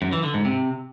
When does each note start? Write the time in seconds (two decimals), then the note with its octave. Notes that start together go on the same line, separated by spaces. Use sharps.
0.02 F#2
0.13 E3
0.23 D3
0.34 G#2
0.45 C3